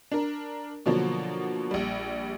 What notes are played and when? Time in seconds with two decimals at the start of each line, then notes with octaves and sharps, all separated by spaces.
0.11 D4 A#4
0.86 B2 D3 F3 F#3 A#3
1.71 A#1 G3